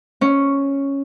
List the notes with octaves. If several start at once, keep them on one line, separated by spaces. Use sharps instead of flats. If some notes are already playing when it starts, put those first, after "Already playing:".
C#4